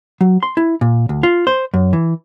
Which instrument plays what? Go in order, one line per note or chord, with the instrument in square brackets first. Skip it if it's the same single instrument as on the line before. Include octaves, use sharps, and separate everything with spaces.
[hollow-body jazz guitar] F#3
C6
E4
A#2
D2
F4
C5
F#2
E3